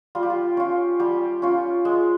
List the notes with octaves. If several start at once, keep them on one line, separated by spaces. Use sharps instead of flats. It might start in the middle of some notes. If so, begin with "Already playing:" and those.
G3 F4
G4
F4
C#4 F4
G3 G4
C#4 F4
G#3